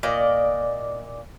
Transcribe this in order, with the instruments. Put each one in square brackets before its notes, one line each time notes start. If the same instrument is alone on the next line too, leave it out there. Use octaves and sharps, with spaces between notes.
[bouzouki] A#2 D5 D#5